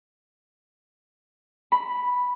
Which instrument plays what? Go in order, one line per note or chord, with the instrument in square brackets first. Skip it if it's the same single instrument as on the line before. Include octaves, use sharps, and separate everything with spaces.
[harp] B5